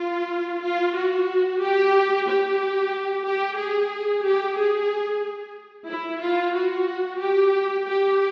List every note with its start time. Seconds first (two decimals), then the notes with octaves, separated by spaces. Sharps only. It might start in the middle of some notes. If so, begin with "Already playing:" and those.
Already playing: F4
0.62 F4
0.95 F#4
1.61 G4
2.27 G4
3.26 G4
3.58 G#4
4.25 G4
4.57 G#4
5.89 E4
6.22 F4
6.54 F#4
7.21 G4
7.86 G4